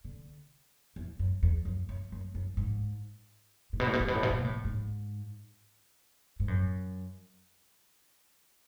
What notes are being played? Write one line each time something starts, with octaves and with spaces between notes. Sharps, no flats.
D3
E2
F#2
E2
F#2
F#2
F#2
F#2
G#2
A2
B2
A2
B2
A2
B2
A2
B2
A2
B2
A2
G#2
G#2
F#2